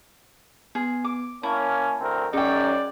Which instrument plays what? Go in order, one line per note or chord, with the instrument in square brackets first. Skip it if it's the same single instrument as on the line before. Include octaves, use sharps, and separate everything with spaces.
[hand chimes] B3 [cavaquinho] G#4
[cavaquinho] D6
[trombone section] A#3 C#4 [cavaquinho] E4 [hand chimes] A5
[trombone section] D2 C4 A#4
[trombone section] F#2 F#3 [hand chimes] C#4 G#4 [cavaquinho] D#4 G5 [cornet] D5